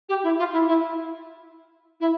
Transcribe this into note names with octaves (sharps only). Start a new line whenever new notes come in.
G4
E4
F4
E4
E4
E4